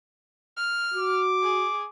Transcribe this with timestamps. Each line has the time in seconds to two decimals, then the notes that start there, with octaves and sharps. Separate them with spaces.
0.57 F6
0.94 F#4 D6
1.43 G#4